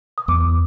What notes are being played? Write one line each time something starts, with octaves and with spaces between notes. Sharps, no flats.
D#6
E2 D6